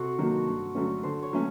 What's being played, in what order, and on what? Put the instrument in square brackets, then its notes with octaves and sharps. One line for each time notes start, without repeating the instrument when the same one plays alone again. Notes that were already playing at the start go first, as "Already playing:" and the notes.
Already playing: [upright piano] C3 [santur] F#4 A4 C5
[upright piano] D#3 F#3 A#3
G2
D3 F#3 A3 C#4
[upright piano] D3 [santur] C5
[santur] C#5
[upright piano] F#3 A3 C#4